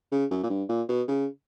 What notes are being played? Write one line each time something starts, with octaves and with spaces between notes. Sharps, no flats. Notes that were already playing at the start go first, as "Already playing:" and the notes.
C#3
F#2
A#2
G2
A#2
B2
C#3